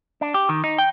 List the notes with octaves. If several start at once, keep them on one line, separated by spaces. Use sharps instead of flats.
D4
G4
D#3
D#4
G5